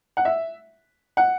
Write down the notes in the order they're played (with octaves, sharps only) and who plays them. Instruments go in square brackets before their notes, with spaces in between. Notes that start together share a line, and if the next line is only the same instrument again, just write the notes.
[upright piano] F#5
E5
F#5